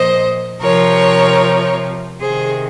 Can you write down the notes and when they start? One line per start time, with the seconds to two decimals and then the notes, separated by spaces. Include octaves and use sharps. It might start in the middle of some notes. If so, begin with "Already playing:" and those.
Already playing: A#2 F3 C5 D#5
0.62 C3 F3 A#4 C#5
2.21 C3 D#3 G#4 C5